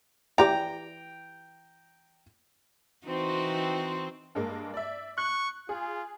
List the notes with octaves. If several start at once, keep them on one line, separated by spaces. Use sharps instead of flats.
E3 G4 D5 G5 A#5
E3 C4 D#4 F#4
G2 G#3 A#3
D5 E5
C#6 F#6
F4 G#4